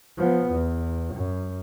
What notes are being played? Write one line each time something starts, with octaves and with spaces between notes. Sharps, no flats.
F3 B3
E2
F#2